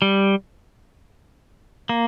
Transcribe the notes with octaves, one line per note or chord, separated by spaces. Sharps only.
G3
A#3